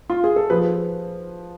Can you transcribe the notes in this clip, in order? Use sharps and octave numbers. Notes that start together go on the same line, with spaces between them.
F4
G#4
A4
F3 G#4 B4